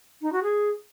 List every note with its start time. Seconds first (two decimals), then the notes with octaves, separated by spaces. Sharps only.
0.22 D#4
0.33 F#4
0.43 G#4